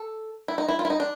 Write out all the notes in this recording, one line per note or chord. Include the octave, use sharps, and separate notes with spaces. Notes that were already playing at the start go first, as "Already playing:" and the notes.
Already playing: A4
E4
D#4
E4
F4
E4
D#4
D4